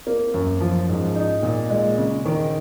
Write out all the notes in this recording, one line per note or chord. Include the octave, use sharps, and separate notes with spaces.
A#3
F#2
F3
G#2
D#4
A#2
G#3
C#3
D#3